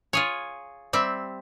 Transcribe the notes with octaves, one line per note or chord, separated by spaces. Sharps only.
F4 G#4 C#5
G3 C4 E5